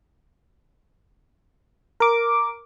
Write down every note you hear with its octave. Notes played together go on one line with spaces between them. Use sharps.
A#4 D6